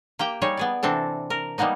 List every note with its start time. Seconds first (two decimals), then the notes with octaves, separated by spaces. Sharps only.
0.19 A#3 G4 G5
0.42 G3 D#4 G#4 C#5
0.57 B3 G#4 D5
0.83 C3 E3 C4 D4 A4
1.30 A#4
1.58 G3 G#3 A#3 B3 D#4